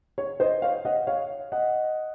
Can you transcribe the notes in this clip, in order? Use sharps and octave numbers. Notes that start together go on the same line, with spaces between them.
C#5
C5 D#5
C#5 F5
D#5 F#5
C#5 F5
D#5 F#5